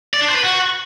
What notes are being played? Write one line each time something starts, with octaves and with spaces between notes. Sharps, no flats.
D5
D4
C5
B4
F#4